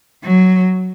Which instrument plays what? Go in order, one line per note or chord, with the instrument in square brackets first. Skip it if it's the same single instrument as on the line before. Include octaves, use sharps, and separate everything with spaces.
[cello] F#3